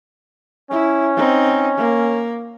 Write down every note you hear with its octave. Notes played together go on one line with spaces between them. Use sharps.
C#4 E4
C4 D#4
A#3